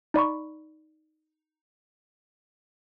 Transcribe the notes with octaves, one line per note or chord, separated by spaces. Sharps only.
D#4 D5 B5 C#6